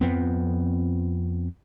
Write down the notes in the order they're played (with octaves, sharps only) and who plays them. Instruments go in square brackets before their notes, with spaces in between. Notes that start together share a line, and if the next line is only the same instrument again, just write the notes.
[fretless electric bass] F2 F3 B3 C4